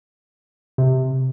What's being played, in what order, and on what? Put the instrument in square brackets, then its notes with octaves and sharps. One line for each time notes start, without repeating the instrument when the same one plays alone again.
[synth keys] C3